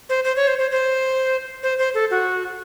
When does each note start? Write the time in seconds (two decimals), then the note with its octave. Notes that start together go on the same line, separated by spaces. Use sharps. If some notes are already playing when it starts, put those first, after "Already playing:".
0.09 C5
0.24 C5
0.36 C#5
0.47 C5
0.59 C5
0.71 C5
1.63 C5
1.79 C5
1.94 A4
2.11 F#4